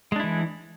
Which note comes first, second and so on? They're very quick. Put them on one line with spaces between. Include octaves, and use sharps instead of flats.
G#3 D4 E4 E3